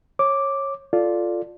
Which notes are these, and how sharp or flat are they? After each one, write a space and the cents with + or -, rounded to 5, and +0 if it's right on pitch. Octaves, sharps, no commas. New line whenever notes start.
C#5 -20 D6 +0
F4 +0 A4 +0 D5 +0